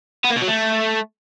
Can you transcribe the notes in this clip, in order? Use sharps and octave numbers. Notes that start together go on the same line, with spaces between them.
B3
A#3
B2
F#3
A3